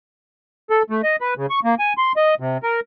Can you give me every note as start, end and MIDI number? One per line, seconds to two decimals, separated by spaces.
0.70 0.83 69
0.90 1.01 57
1.03 1.16 75
1.21 1.34 71
1.37 1.46 49
1.50 1.60 85
1.64 1.75 58
1.79 1.93 80
1.98 2.12 84
2.16 2.35 75
2.40 2.58 48
2.63 2.80 70